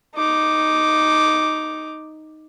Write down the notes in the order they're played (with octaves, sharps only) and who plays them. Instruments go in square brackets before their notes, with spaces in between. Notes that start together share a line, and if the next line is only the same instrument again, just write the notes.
[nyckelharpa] D#4 D6